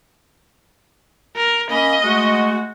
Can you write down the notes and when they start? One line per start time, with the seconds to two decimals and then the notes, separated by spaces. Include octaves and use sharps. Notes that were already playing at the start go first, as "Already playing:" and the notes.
1.36 A#4
1.70 A#3 C#4 D#5 B5
2.04 G#3 A3 F#4